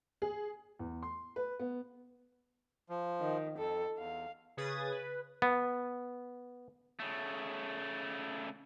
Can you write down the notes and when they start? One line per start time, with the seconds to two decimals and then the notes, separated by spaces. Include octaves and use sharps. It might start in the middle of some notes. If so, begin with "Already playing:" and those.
0.22 G#4
0.79 E2
1.03 C6
1.36 B4
1.59 B3
2.89 F3
3.21 D#3
3.58 F2 A4
3.99 E2 F5
4.57 C#3 G#4 B4 D#6 G#6 A6
4.92 B4
5.42 B3
6.99 C#3 A3